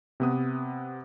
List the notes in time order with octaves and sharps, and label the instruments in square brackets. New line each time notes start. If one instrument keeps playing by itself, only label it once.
[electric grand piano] C3 B3 D#6